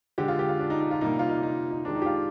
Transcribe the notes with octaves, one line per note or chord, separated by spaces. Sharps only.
D3 G#3 G4
F4
G4
F4
D4
D#4
D#4
F4
C3 G3 A#3 D#4
F4
D#4
D#4
D#4
D#3 G#3 D4
D#4
G4
F4